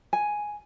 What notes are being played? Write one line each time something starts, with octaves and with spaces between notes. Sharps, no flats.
G#5